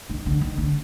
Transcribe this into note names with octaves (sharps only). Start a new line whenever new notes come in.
D#3
D3
D#3
D3